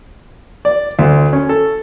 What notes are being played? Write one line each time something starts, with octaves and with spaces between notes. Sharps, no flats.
D5
D2
C#4
A4